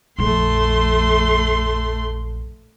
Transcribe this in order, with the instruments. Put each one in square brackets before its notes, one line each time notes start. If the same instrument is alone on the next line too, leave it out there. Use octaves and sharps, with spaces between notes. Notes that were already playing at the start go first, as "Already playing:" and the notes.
[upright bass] A#1 F2 [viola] A3 C6